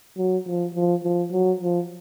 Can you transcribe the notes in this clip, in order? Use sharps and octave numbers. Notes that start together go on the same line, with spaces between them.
F#3
F3
F3
F3
F#3
F3